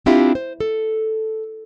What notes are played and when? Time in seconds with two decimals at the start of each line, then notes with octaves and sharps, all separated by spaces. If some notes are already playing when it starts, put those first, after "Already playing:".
0.06 C4 D4 E4 F4 G4 E5
0.35 C5
0.60 A4